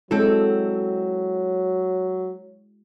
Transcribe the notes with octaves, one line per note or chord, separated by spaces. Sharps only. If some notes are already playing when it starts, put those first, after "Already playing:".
F#3 G#3 C4 E4 F#4 A4